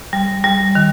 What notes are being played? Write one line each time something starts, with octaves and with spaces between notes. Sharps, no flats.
G3
G3
D#3